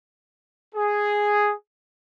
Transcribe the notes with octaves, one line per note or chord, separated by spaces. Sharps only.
G#4